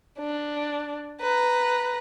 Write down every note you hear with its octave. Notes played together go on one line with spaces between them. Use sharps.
D4
B4 A#5